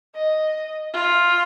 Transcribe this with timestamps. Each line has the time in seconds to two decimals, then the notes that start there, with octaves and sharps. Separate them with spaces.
0.16 D#5
0.94 F4